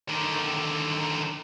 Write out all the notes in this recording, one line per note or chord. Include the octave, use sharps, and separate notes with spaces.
D3 D#3